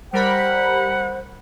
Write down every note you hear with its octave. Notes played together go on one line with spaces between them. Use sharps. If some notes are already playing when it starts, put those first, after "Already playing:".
G3 A#4 C5 F#5 B5